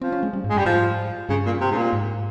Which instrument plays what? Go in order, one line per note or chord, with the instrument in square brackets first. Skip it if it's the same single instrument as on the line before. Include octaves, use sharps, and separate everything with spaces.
[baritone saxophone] F3 [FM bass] C4
[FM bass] C#4
G#3
G3
G#2
[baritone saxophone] G#3
[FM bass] G2
[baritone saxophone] G3
[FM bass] G#2 [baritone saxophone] F3
[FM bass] G2 [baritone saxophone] C#3
[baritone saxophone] A#2
C3
G#2
A#2
[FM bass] G#2